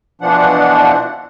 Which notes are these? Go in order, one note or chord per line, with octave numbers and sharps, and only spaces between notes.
B2 E3 F3 D4 F#5